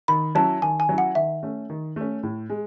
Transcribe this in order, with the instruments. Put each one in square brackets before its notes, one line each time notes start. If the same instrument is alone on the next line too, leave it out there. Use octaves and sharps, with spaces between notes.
[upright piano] D#3 [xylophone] B5
[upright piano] F#3 C#4 E4 [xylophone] A5
[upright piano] D#3 [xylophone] G#5
[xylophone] G#5
[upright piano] F#3 C#4 E4
[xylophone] F#5
[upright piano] D#3 [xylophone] E5
[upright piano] A3 C#4
D#3
A3 C#4
A2
G#3